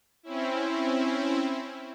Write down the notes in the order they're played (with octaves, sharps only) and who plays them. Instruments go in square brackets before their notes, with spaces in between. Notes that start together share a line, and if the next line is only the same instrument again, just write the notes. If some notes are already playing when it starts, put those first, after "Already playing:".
[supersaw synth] C4 C#4 E4